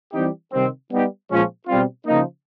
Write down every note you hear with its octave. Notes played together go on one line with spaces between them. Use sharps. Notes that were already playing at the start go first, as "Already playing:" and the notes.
E3 G3 C4 D#4 G4
C3 D#3 G3 C4
G3 B3 D#4 G4
A#2 F3 G#3 C#4 F4
B2 G3 C4 F4
C#3 F3 A#3 D#4